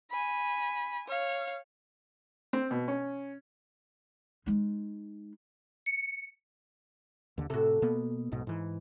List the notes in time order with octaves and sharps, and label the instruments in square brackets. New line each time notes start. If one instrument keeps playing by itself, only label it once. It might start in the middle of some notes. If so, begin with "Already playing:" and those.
[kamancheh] G#5 B5
C#5 F5
[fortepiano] C4
B2
C#4
[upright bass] G#3 D#4
[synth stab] C#7
[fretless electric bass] D#2 D3
[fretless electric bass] A2 C3 [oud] F#4 A4
[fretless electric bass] B2 A#3 B3
B1 G#2 B2
G#2 E3